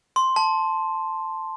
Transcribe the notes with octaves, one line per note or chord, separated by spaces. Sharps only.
C6
A5